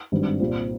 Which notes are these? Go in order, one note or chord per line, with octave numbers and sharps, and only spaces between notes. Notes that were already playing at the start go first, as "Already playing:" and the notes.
G#1 G2 G3 C4
C2 A#2 G3 C4 F4